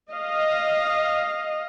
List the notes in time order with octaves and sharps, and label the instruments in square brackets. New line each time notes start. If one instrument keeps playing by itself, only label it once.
[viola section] D#5 F5